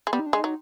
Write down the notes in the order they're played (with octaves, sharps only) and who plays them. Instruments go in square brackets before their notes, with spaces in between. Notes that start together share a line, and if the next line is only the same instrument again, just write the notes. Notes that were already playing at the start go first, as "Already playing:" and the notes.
[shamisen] G#3
[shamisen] G3 [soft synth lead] B3
[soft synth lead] D#4
D4
[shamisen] G#3
[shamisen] F#3 [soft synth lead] D#4